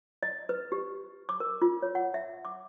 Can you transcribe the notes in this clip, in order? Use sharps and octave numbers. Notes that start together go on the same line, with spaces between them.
D#5
B4
G4
D6
A#4
F4
C#5
F#5
E5
D6